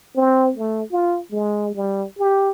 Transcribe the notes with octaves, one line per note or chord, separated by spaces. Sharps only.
C4
A3
F4
G#3
G3
G4